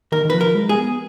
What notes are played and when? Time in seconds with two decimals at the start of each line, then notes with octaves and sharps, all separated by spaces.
0.12 D#3 A#4
0.25 D#3
0.30 F3 B4
0.41 A#4
0.55 G#3
0.69 G#4
0.76 B3